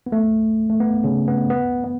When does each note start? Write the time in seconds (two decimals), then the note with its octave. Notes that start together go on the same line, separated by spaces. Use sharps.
0.06 B3
0.12 A3
0.70 A3
0.80 B3
1.04 C#3 C#4
1.28 B3
1.50 B3
1.84 B3